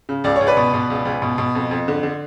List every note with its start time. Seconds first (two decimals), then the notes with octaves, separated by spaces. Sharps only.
0.09 C#3
0.24 C#2 D5
0.36 C#5
0.41 C#2
0.47 B4 D5
0.57 B2
0.74 B2
0.90 C#2
1.05 C#2
1.22 B2
1.38 B2
1.55 F2
1.71 F2
1.88 D3
2.03 D3